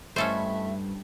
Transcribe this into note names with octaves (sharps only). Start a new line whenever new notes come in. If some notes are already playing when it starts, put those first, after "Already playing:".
G2 A3 C#4 E4 A4 C5 D#5 E5